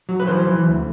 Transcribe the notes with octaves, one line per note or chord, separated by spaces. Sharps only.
F#3
B4
E3 C5
E3
D2